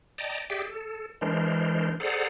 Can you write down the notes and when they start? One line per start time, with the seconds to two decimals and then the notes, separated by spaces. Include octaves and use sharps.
0.18 D5 D#5 G5 A5 A#5
0.50 G4 G#4 D5 E5 G5
0.69 A4
1.21 E3 G#3 D4 A#4 C5
2.00 G#4 A4 C5 D5 F#5 A#5